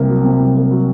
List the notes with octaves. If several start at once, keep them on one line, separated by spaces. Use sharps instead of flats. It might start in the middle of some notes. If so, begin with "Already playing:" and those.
Already playing: C2 C3 A#3
F#3
C3
C2
A#3
F#3